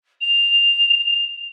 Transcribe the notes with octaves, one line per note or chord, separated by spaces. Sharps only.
F7